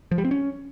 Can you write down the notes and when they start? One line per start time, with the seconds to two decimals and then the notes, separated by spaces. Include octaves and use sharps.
0.11 F3
0.18 G3
0.25 C4
0.31 C#4